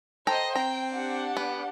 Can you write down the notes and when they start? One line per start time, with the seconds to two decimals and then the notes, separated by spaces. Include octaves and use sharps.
0.27 A4 C5 D#5 G5 A#5
0.55 C4 G5 A#5
0.95 D4 G4 F#5
1.37 B3